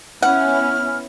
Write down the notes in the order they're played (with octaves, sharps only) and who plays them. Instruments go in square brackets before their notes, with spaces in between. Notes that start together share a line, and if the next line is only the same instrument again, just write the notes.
[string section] B3 C#4 E4 [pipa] F#5 [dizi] F6